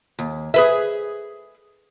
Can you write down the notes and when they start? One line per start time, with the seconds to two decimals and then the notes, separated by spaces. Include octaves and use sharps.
0.19 D#2
0.54 G#4 B4 E5